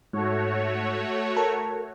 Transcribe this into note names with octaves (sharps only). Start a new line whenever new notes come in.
G#2 A3 F#4 C#5
A4 A#4